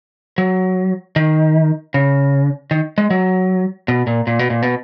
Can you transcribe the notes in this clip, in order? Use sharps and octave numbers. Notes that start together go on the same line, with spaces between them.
F#3
D#3
C#3
D#3
G#3
F#3
B2
A#2
A#2
B2
A#2
B2